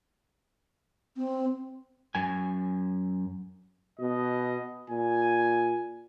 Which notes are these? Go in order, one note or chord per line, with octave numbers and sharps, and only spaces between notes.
C4
F#2 G#5
B2 D#5
A#2 G#5